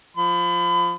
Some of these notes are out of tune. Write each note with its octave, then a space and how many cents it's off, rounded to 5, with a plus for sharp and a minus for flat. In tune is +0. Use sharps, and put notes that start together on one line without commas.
F3 +0 B5 +35